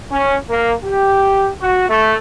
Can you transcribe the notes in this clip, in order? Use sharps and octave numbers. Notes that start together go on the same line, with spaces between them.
C#4
A#3
G4
F#4
A3